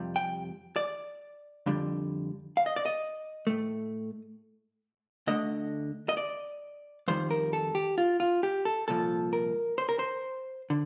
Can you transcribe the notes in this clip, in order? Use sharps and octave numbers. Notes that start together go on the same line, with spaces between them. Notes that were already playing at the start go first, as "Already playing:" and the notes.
Already playing: F2 C3 G3
G5
D5
F2 D3 G3
F5
D#5
D5
D#5
A2 A3
D2 D3 A3 D#5
D#5
D5
F2 D#3 G3 C5
A#4
A4
G4
F4
F4
G4
A4
C2 A#2 F3 A4
A#4
C5
A#4
C5
D3